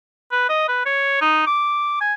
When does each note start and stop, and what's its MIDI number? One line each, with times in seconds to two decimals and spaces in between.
0.31 0.48 71
0.49 0.68 75
0.68 0.81 71
0.86 1.18 73
1.21 1.44 63
1.47 1.99 86
2.01 2.14 80